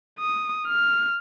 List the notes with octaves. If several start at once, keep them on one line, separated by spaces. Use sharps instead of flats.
D#6
F6